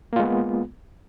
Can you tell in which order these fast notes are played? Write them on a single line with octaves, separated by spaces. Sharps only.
A#3 F4 G#3 B3